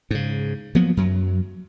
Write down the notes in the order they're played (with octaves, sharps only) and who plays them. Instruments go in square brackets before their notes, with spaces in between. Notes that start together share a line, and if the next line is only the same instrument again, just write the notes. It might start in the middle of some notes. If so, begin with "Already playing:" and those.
[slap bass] G#2 C#3
F3 F#3 A#3 B3
F#2 F#3